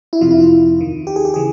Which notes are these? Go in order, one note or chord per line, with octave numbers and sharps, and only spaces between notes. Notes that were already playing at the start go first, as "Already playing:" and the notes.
E4
F2 C3 F3 F4
E4
F4
D#2 D#3
G4
G#4
G4
C#3 E3 G#4